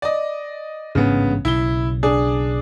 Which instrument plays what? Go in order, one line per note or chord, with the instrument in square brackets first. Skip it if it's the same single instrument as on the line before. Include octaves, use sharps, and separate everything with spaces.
[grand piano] D5 D#5
[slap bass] A1 G#2 D4 [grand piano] C#3 B3
[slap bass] B1 C#3 [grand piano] E4 G7
[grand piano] D4 G#4